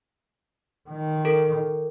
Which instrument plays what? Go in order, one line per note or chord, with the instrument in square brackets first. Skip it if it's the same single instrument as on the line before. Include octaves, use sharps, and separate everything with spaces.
[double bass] D#3
[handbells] A4 A#4